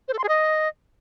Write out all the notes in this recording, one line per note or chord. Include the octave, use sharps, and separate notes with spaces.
C5
A4
C6
G#4
D#5